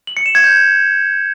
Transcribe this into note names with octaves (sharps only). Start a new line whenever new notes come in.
F#7
C#7
E7
G#6
G6